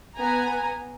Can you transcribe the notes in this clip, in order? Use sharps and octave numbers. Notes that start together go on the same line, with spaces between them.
B3 G#5 A#5